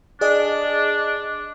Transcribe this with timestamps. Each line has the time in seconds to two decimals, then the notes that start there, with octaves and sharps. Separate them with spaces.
0.21 D4 G#4 D5 D#5